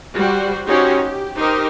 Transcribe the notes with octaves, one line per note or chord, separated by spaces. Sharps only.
G3 F#4 C5
C#4 D#4 F#4 G4 C5 C#5
G4
D#4 G4 A#4 C5 D#5